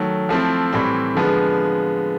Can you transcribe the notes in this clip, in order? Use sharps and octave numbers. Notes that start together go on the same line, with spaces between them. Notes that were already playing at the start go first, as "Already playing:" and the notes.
Already playing: D#3 F#3 A3
F3 A3 C4 E4
A2 E3 G3 C4
D3 F3 G#3 B3